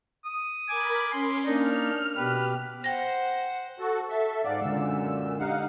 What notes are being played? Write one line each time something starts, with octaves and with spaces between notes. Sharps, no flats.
D#6
A#4 G#5 B5 D6
C#4 C6
A#3 D4 D#4 F6
B2 G4 B4
C5 F#5 G5 A#6
F#4 A4
A4 E5
G#2 D5 F5 F#5
F#2 A#2 D3 G#3 E6
D4 D#4 G4 F5 F#5